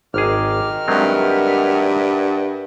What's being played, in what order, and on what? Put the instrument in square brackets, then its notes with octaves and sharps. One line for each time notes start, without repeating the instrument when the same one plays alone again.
[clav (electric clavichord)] G#1 G#4 [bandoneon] D#3 F6 [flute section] D6
[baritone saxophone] G2 [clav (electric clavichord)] F#3 G#3 C4 [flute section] A#4 E5 F#5